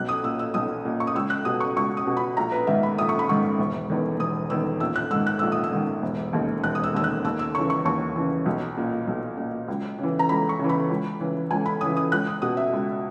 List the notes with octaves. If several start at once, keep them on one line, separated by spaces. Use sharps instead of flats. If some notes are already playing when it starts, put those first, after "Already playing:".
Already playing: B1 F#6
D#6
A#2 E6
E6
B1 D#6
A#2
C#6
D#6
C#2 E6
F#6
B2 D#6
C#6
C#2 C#6
D#6
B2
B5
A#1 A#5
B4
G#2 D#3 E5
B5
A#1 D#6
C#6
B5
G#2 D#3 C#6
E1
E2 D#3
E1 D#6
E2 D#3 E6
A#1 E6
F#6
G#2 D#3 E6
F#6
A#1 E6
D#6
E6
G#2 D#3
E1
D#2 D#3
E1 F#6
D#6
E6
D#2 D#3 E6
F#6
D#2 E6
E6
C#3 E3 C#6
C#6
D#2 C#6
C#3 E3
B1
A#2
B1
A#2
C#2
C#3 E3
A#5
C#2 B5
C#6
C#3 E3
B5
C#2
C#3 E3
C#2 G#5
B5
C#3 E3 D#6
D#6
C#2 F#6
D#6
B2 D#6
E5
C#2